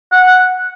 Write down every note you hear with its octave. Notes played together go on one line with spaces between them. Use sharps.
F#5